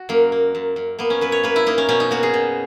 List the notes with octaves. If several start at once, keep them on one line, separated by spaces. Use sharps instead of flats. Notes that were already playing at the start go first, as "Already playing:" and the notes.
Already playing: F#4
F#2 A#3
A#3
F#2
F#2
A#3 B3
C#4
F#2 B4
C#5
A#3 B4
E4
A#3 D#4
C#4
B2 C#4
D#4
A#3 F#4
G#4
B2